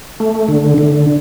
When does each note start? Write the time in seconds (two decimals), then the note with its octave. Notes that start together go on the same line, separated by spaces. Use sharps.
0.20 A3
0.48 D3
0.78 D3